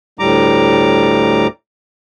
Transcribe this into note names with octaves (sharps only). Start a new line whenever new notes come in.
D2 A2 G3 A#5 D6